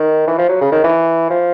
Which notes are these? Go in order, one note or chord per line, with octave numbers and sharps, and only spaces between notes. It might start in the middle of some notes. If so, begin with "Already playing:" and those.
Already playing: D#3
E3
F3
F#3
C#3
D#3
E3
F3